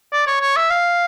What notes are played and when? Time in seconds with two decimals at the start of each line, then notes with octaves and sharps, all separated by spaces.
0.13 D5
0.27 C#5
0.41 C#5
0.56 E5
0.70 F5